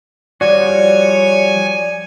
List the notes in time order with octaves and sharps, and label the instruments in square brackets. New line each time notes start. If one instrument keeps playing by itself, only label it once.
[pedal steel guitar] F3 G3 F#4 [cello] C#5 [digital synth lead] D5 [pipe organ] G#5